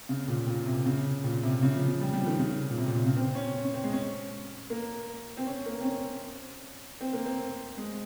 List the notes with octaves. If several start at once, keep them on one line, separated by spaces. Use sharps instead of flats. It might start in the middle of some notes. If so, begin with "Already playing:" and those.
C#3
A#2
A#2
C3
C#3
A#2
C3
C#3
F3
F3
G3
G3
F3
D#3
C#3
A#2
C3
A#2
C3
C#3
C4
C#4
C#4
C#4
C4
G#3
C#4
A#3
C4
C#4
A#3
C4
C#4
C4
A#3
C4
G#3